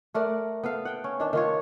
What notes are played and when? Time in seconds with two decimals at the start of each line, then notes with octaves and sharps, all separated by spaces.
0.14 A3 A#4 D5 F#5
0.63 B3 A4 F5
0.85 F#5 G5
1.04 C#4
1.20 D#3 D4
1.33 D#3 F4 C#5